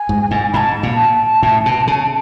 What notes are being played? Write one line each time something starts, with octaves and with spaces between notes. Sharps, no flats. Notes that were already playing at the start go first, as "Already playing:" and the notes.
Already playing: G#5
G#2
G#2
G#2 A5 B5
A#2
A2
B2
C#3